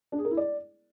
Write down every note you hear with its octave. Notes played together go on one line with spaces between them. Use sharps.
D4
G#4
A#4
E4
D5